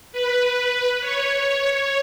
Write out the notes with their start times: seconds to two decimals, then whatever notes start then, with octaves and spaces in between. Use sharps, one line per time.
0.12 B4
1.00 C#5